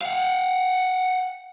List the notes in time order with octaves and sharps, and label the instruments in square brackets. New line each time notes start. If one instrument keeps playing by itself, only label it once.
[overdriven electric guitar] F5 F#5